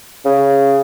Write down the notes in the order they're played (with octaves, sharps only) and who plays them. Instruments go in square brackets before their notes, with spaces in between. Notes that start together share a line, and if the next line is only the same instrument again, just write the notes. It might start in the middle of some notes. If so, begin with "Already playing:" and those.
[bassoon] C#3